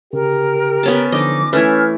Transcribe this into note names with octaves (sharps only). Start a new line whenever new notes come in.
C#3 G4 A#4
B3 C#4 A5
D3 F3 D#4 D#5 D6
E3 A3 C#4 B4 F6 G#6